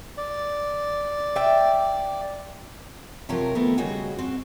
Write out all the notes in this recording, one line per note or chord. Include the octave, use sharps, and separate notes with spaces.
D5
E5 G5
C3 F3 F#3 G4 A#4
D#3 A3 B3 C4 A4 A#4
C#3 G3 D#4 F#4 G#4
C4 F#4